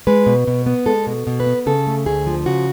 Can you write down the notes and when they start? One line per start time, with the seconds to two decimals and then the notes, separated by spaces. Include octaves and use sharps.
0.07 G#3 B4
0.26 B2
0.47 B2
0.66 B3
0.86 G#3 A4
1.07 B2
1.27 B2
1.40 B4
1.46 B3
1.66 C#3 A4
1.87 A3
2.06 D2 G#4
2.27 F3
2.46 C#3 F#4